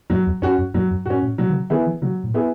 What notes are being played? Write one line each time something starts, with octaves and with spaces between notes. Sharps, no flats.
F#2 F#3
E2
F#2 C#4 F#4
F#2
F#2 F#3
F#2
G#2 C#4 F#4
A2
B2 F#3
D#3
C#3
D#3 B3 E4 G#4
E3
C#3 F#3
A2
B3 E4 G#4